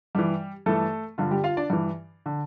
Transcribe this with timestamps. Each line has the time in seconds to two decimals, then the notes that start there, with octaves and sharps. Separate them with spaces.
0.15 G2 E3 G3 G4
0.66 G2 E3 A3 A4
1.18 G2 D3 F4
1.31 G3 G4
1.44 F4 F5
1.57 D4 D5
1.70 G2 E3
2.26 D3